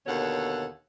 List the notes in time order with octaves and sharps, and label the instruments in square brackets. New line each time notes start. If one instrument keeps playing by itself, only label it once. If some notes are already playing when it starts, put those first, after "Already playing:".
[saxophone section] D#2 B2 D3 A4 C#5 F#5